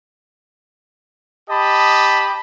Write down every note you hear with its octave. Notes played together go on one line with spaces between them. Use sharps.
G4 D#5 A5 B5